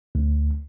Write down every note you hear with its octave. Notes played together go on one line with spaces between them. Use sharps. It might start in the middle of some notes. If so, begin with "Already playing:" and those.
D2